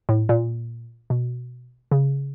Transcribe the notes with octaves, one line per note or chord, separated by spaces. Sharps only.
A2
A#2
B2
C#3